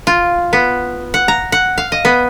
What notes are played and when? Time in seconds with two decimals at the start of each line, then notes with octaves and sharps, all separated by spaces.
0.07 F4
0.53 B3
1.14 F#5
1.28 A#5
1.52 F#5
1.78 F5
1.92 D#5
2.05 B3